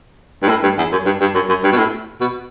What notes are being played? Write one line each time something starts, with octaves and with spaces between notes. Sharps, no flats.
G2
A2
G2
E2
F#2
G2
G2
F#2
F#2
G2
B2
A2
B2